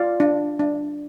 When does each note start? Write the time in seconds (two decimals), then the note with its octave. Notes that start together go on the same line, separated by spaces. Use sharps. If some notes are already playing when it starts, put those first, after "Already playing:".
Already playing: F4 D5 F5
0.20 D4
0.59 D4